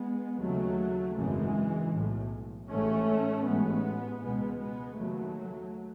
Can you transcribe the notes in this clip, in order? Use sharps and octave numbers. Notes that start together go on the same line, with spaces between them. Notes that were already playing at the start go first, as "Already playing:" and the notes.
Already playing: G#3 B3
D#2 C#3 F#3 A3
G#1 F#2 C#3 E3 G#3
B1 A2
A1 G#2 A3 C#4
A1 G#2 G#3 B3
C#2 B2 G#3 B3
G#3 B3
D#2 C#3 F#3 A3